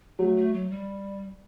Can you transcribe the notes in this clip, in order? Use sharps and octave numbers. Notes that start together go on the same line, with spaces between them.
F#3 A3
A3
F#3
G3